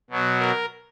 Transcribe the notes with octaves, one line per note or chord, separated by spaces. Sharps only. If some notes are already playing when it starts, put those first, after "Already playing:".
B2 F#3
A#4